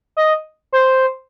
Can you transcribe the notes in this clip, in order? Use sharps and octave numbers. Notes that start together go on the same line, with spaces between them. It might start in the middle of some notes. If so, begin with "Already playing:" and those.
D#5
C5